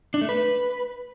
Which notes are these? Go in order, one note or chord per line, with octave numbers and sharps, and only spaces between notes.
D4
A3
B4